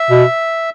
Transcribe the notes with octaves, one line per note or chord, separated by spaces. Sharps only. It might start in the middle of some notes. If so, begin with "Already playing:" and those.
Already playing: E5
B2